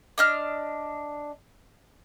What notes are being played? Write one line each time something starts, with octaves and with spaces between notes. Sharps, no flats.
D4 D#5 F6